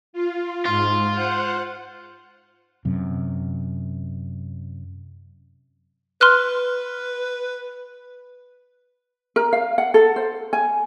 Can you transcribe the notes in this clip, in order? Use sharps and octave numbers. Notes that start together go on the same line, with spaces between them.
F4
G#2 F4
C5 F#5
F#2 C3
B4 C6 F6 F#6
A#4
F5
F#5
A4
C5
G#5